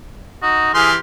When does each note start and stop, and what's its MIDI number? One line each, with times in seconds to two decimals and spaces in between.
0.42 0.73 63
0.42 0.72 66
0.74 0.96 52
0.74 0.98 67
0.74 0.90 68
0.74 0.96 84
0.74 0.96 89